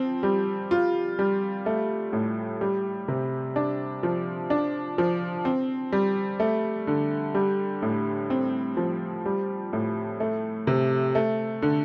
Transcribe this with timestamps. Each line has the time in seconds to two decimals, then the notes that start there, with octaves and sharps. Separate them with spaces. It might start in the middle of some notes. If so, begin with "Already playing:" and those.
Already playing: F3 C4
0.23 G3
0.71 F4
1.19 G3
1.66 A3
2.13 A2
2.61 G3
3.08 C3
3.56 D4
4.03 F3
4.50 D4
4.98 F3
5.45 C4
5.92 G3
6.40 A3
6.87 D3
7.35 G3
7.82 A2
8.30 C4
8.77 F3
9.26 G3
9.73 A2
10.20 A3
10.67 C3
11.15 A3
11.62 D3